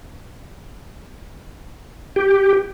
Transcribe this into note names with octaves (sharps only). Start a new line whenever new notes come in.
G4